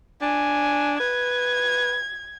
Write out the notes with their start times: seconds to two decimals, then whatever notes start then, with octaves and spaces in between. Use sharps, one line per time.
0.22 D4 G#5
1.00 B4 G#6